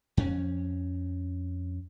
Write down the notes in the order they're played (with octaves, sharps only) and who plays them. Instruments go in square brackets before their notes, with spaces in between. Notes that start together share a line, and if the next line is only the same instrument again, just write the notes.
[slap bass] F2 C#4